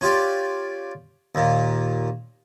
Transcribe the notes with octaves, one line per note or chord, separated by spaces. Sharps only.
C#4 F4 G4 D5
D#2 A#2